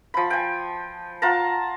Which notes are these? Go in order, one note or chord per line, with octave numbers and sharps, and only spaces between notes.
F3 B5
G5 G#5
F4 F#5 A5 A#5